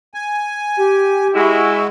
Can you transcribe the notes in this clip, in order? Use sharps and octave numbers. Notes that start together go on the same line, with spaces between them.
G#5
G4
G#3 E4 F#4